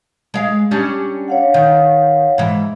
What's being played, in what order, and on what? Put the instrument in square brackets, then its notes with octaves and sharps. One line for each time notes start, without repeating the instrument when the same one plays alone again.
[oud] G#3 F5
G3 C#4 D4
[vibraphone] C#5 F5 F#5
[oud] D#3
G#2 E3